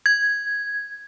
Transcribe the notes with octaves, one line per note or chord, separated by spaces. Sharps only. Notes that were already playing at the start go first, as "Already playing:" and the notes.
G#6